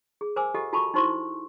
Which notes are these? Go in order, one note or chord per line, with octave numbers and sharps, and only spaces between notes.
G#4
A#4 C5 G#5 D6 E6
F4 G4 A4 D#5 F#5
F4 F#4 A4 A5 B5 C#6
D#4 E4 F#4 C5 C6 C#6